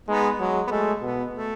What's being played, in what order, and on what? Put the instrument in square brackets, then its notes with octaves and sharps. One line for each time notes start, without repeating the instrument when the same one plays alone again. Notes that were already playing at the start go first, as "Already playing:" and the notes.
[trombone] G#3 [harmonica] B3 D#4
[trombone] F#3 [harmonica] G#3
[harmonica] B3
[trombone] G#3 [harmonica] A3
[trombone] B2 [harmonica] B3
[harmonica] A3